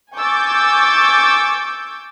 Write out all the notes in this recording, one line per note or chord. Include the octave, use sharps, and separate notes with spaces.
G#5 C#6 D6 E6 G6 A6